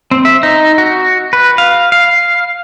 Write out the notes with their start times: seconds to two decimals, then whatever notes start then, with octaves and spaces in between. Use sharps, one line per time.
0.11 C4
0.25 E5
0.43 D#4
0.78 F#4
1.33 B4
1.58 F5
1.92 F5